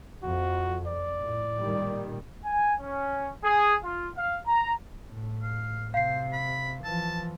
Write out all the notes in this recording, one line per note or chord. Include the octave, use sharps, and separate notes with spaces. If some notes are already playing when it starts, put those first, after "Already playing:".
F2 F3 F#4
D5
A2
A#2 D#3 G3
G#5
C#4
G#4
F4
F5
A#5
A2
F5
C3 C5 F5 C7
B5
E3 F3 A5